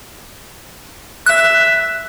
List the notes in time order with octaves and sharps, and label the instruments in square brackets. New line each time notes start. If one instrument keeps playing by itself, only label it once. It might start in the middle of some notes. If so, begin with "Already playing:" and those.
[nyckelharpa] E5 [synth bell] F#6